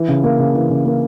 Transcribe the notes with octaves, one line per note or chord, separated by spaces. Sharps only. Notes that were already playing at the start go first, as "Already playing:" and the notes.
Already playing: E3
C#3
A#3
C#3
E3
C#3
A#3